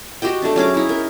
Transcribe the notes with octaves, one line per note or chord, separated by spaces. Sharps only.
F#4 G4 D#5 G5
A3 D4
F#3 C#4 G#4 D6
D#4 E4
A#4